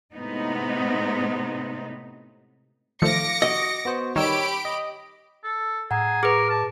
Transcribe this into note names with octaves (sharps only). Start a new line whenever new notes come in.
A2 C3 G#3 B3 D#4
D#3 F3 A3 F5 D6 A#6 C#7
F#4 D#5
B3 F#4 C5
D#3 G3 G4 C#5 B5 E6 D7
D#5
A4
A2 G#4 F#5 A#5
G#4 A#4 B4 D6
A5